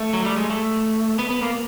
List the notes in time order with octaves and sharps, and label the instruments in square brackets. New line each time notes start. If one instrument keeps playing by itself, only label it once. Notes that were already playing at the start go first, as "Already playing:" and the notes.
Already playing: [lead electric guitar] A3
F#3
G3
G#3
A3
B3
B3
A#3